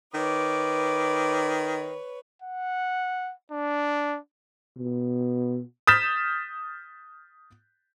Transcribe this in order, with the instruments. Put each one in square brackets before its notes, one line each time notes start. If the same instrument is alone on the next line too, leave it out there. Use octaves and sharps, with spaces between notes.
[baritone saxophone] D#3 [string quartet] B4 C#5 [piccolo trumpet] D6
[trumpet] F#5
D4
[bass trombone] B2
[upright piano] D#6 F6 G6 A6 B6 E7